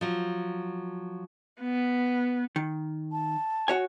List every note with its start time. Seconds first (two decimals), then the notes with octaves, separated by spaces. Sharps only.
0.01 F3 F#3
1.61 B3
2.56 D#3
3.12 A5
3.68 F#4 C#5 G#5